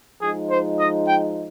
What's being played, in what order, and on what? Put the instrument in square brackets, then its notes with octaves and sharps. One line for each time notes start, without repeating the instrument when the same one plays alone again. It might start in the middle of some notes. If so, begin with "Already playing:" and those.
[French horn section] F3 G#3 D#4 [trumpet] G#4
[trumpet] C5
D#5
G5